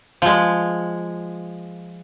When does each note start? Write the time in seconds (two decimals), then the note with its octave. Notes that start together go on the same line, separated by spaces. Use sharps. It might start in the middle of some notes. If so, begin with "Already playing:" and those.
0.22 F3 G#3